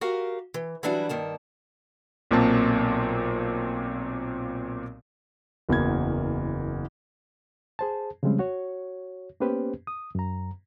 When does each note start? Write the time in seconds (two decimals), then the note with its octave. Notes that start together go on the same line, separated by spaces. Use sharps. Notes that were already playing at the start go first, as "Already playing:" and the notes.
0.01 F#4 G4 A#4 F5
0.54 E3
0.83 E3 F#3 G3 D4 E4 F#4
1.09 G2 D#3 A#3 A5
2.31 B1 A#2 A#3 C4 A5
5.69 F#1 E2 F#3 A#3 G#6
7.79 G#4 C5 A5
8.23 C#3 F3 G3 G#3 C4 C#4
8.39 F#4 C#5
9.40 A#3 B3 C#4 G4 B4 C5
9.87 D#6
10.15 F#2 A#5